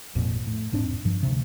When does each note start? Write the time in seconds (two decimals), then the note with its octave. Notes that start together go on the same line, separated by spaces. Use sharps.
0.15 G#1 F2 A#2
0.47 A2
0.72 E1 G#2 C4 D4
1.05 G2 F3
1.23 D2 C3